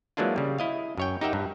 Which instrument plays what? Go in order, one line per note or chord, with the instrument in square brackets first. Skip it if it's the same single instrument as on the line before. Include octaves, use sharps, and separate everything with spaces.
[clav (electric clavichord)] E3 F#3 G#3 A#3 D4 F4
C#3 G3
E4 D#5 F5
F#2 C#5 G5
D#4 G4 A#4 E5 F#5 G5
G2